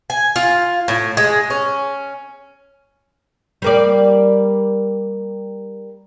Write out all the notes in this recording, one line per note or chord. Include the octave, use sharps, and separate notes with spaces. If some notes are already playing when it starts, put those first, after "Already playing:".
G#5
F4
A2
G#3
C#4
G3 A#3 D5